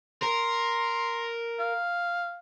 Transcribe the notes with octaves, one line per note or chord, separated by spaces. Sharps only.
A#4 C6
F5